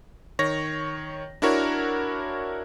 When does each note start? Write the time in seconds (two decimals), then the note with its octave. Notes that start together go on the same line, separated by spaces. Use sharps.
0.39 D#3 C#5 A#6
1.42 D4 E4 F#4 A#4 C#5